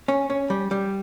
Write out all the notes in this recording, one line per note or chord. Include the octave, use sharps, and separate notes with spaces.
C#4
C#4
G3
G3